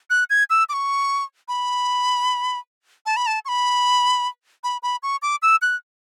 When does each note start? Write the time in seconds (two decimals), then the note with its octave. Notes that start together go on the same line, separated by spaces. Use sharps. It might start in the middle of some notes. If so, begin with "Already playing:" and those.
0.10 F#6
0.30 G#6
0.50 E6
0.69 D6
0.73 C#6
1.48 B5
3.06 A5
3.17 B5
3.27 A5
3.45 C#6
3.48 B5
4.64 B5
4.83 B5
5.03 C#6
5.22 D6
5.42 E6
5.62 F#6